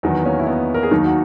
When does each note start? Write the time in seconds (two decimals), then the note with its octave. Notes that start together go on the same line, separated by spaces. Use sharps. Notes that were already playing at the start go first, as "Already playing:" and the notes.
0.03 E2 D#3 F#3 B3
0.25 A#3 C#4
0.39 E4
0.47 B3 D#4
0.74 A#4
0.83 G#4
0.91 D#2 D#3 F#3 D#4 F#4
1.05 F#4